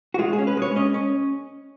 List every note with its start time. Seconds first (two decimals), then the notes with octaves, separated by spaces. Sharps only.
0.14 F#4
0.19 G#3 F4
0.33 G#4
0.38 C#4
0.47 B4
0.57 G#3 C#5
0.76 C#4 D#5
0.94 C#4